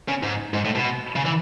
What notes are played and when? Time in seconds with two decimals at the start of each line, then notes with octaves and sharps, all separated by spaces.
0.09 C#3
0.23 G#2
0.54 G#2
0.65 A2
0.75 B2
1.16 C#3
1.25 E3